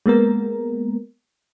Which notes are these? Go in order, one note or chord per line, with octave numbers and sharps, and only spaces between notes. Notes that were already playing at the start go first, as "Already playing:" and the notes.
G#3 A#3 B3 A#4